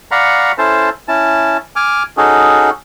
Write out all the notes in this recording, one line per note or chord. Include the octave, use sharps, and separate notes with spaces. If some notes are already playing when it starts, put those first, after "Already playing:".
D5 F5 F#5 A#5 B5 C#6
C#4 E4 A4 C5 A5
C#4 E4 A5
G#5 D6 F6
C#4 D#4 F#4 G#4 A4